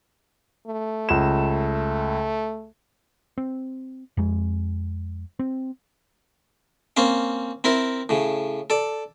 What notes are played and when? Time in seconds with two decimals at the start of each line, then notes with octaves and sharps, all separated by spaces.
0.67 A3
1.09 C#2 E7
3.38 C4
4.17 F2 G#3
5.39 C4
6.97 A#3 C4 C#4 F5
7.64 C4 E4 A#4
8.09 A2 C#3
8.70 A4 D5